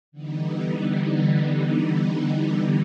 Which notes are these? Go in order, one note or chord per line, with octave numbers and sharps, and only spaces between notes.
D3 E3 G3 B3 D#4